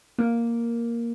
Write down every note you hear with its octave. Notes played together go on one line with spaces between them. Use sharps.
A#3